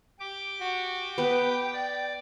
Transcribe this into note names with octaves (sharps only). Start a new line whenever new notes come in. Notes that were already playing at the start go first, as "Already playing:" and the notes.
G4 D6
F#4
B3 B4 G5
D5